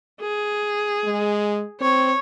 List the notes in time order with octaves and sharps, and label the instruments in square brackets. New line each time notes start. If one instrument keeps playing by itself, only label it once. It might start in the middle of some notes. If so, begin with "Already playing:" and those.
[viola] G#4
[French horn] G#3
[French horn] C4 [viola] C#5